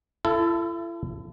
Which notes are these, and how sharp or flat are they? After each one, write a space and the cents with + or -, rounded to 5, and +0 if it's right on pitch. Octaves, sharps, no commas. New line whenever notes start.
E4 +40 A4 +5